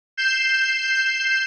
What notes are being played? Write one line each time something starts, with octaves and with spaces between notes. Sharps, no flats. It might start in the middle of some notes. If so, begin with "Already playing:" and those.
G6 C7 E7